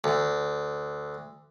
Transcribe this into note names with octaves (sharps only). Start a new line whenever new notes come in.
D2